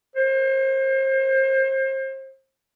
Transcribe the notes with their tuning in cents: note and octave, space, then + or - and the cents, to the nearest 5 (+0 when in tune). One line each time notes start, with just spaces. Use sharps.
C5 +35